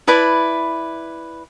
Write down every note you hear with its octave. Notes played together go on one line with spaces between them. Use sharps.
E4 B4 D5 A5